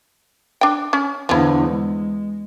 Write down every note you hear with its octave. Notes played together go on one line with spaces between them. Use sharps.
D4 G5
C#4
E2 D3 F3 E4
G#3